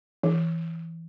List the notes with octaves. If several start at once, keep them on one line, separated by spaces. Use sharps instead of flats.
E3